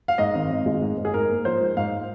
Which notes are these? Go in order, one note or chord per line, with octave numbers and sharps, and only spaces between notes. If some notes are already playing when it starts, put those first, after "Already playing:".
F5
G#2 D#5
G#1
G#1
G#3
G#2
G#2
G#4
G#2 A#4
A#3
F3 C5
G#2
G#2 F5